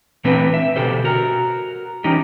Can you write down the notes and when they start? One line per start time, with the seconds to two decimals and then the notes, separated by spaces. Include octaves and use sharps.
0.24 A#2 E3 A3 C4 D4 B4
0.54 E5
0.76 B2 D3 G4 A4 C5
1.04 F#4 A#4
2.04 E3 C#4 D#4 G4